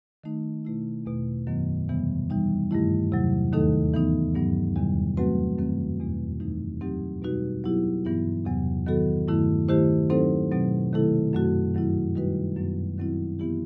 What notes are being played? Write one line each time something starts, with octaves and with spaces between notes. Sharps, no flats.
D#3 A3 D#4
B2 A3 E4
E2 B2 A3
F#2 D#3 F#3 B3
E2 C3 E3 G3 B3
E3 G3 D#4
G2 D#3 A3 E4
E2 C3 F#3
D#2 D#3 A3 D#4 A4
E3 B3 D#4
G2 F#3 B3
E2 C3 D#3 G3
F#3 A3 C4 F#4 B4
F#2 D#3 A3 C4
E2 B2 A3
F#2 E3 A3 D#4
F#3 C4 D#4 G4
B2 G3 D#4 F#4 B4
F#3 B3 E4 G4
G2 E3 B3 E4
E2 C3 F#3 B3
D#3 F#3 B3 F#4 A4
G2 D#3 A3 E4
D#3 A3 E4 G4 C5
F#3 C4 D#4 A4 C5
B2 F#3 C4
C3 D#3 A3 E4 A4
F#2 F#3 A3 C4 F#4
G2 D#3 F#3 C4 E4
D#3 G3 D#4 F#4 B4
F#2 F#3 B3
D#3 F#3 C4 E4
E3 B3 E4 G4